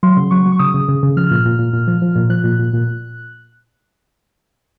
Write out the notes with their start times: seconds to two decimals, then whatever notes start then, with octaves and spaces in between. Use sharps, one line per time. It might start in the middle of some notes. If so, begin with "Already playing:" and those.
0.03 F#3 C6
0.17 C#3
0.31 F#3 C#6
0.45 F#3
0.52 C#6
0.59 C#3 D#6
0.74 C#3
0.88 C#3
1.03 C#3
1.17 F3 F6
1.31 A#2
1.45 A#2
1.59 A#2
1.73 A#2
1.87 F3
2.02 F3
2.16 A#2
2.30 F3 F#6
2.44 A#2
2.59 A#2
2.73 A#2